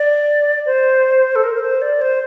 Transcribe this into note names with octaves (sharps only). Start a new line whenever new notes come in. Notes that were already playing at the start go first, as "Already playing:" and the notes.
Already playing: D5
C5
A4
A#4
A#4
C5
D5
C5